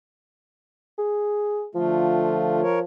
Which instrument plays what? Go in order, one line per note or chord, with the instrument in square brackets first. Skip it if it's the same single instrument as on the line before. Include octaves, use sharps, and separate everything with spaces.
[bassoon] G#4
[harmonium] D3 A3 F4 [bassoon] F3
[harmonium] A#4 C#5